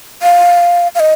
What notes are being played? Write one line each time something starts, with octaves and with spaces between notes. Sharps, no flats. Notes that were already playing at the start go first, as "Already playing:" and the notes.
F5
F5
D#5